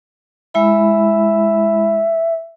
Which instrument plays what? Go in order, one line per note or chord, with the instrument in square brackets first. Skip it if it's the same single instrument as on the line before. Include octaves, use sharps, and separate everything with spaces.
[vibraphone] G#3 E4 B5 [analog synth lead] E5